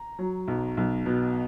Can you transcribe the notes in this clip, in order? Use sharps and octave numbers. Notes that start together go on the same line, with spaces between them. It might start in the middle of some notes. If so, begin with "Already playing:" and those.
Already playing: A#5
F#3
B1
B1
B2